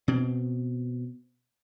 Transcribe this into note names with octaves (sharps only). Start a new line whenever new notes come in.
B2 C4